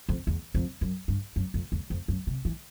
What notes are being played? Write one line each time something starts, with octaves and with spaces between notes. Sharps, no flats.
F2
E2
F2
F#2
G2
F#2
F2
E2
F2
F#2
C3
E3